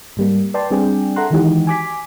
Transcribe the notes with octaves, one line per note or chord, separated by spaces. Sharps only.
G#2 G3 A#3
B4 D5 G5 A5 C6
G3 C4 D4 G#4 D5 G5
A4 E5 F#5 A#5 C6 F#6
D#3 E3 G#3 D#4 F#4 G4
G#5 D6 B6